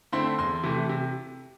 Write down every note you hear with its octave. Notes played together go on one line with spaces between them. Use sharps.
D3 A3 C4 E4 C6
E2 C6
C3 E3 A3
C3